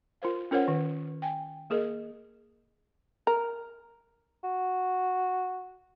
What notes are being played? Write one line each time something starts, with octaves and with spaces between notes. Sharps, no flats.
F4 A#4 C5 F5
C#4 F4 A#4 C5 C#5 F#5
D#3
G5 G#5
A#3 G#4 A#4 D#5
A#4
F#4